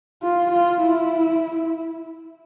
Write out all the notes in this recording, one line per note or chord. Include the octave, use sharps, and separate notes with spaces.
F4
F4
E4